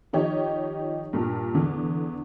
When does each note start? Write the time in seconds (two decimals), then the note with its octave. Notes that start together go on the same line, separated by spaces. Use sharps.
0.13 D#3 F3 D#4 G4 C#5
1.13 G2 A#2
1.54 E2 D3